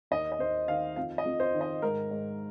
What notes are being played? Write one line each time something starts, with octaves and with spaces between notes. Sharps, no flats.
D#2 D#5
D#5
D#2 C5
D#3 F5
F2 F5
D#5
F2
C5
D#3
D#5
G#2 A#4
G#2